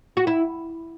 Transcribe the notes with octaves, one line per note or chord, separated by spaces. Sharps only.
F#4
E4